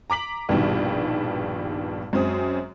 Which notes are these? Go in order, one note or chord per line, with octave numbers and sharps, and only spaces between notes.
A#5 D6 B6 F#7
A#1 G2 B2 D#3 G3
F#2 F#3 G#3 C4 D#6